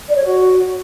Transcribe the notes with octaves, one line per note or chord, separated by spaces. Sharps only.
D5
C#5
F#4